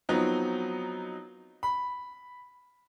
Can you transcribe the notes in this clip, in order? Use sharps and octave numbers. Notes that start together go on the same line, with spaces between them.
F3 F#3 B3 C4 D#4
B5